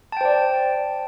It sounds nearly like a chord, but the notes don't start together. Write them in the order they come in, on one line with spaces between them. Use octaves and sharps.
A5 G5 C5 D5